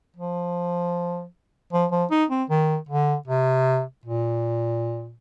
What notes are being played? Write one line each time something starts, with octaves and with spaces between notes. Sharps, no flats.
F3
F3
F3
D#4
C4
D#3
D3
C3
A#2